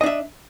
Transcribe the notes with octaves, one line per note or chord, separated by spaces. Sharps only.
D4 D#5 E5